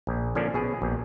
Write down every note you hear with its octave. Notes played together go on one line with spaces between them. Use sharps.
A#1
D3 F3 A#3 C#4 D4
B2 G#4
A#1